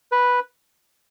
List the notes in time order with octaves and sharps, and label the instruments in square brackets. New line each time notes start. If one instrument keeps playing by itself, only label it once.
[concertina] B4